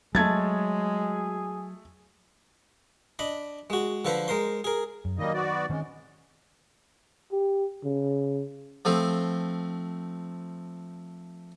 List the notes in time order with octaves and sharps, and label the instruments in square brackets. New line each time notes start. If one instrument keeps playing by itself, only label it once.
[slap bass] F#3 [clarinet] G#3 [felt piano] A3 G#6 A6 [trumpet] G#4
[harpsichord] D4 D#5 B5
G#3 F#4
D3 F3 A4 B4 C5
G#3 A#4 C5 C6
G#4 A#4
[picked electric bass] F#2
[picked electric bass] D#3 F#3 [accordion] G3 A#3 D#5
[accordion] B3 F#4 D5
[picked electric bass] D#3 C4 C#4 [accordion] G#3
[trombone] G4
C#3
[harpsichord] F3 A3 C4